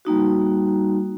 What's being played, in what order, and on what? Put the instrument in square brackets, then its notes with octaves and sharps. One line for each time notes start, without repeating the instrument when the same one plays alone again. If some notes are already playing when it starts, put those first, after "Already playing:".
[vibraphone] G3 A#3 D#4 F#4